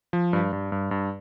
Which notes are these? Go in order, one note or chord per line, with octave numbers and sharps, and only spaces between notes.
F3
G2
G2
G2
G2